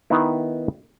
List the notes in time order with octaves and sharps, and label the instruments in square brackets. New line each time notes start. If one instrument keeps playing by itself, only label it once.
[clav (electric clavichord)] D#3 B3 D#4 E4